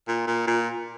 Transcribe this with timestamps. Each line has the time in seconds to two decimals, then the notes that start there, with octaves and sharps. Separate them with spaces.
0.08 A#2
0.27 A#2
0.47 A#2